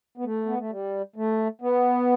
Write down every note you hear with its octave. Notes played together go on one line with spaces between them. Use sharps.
B3
A3
B3
A3
G3
A3
B3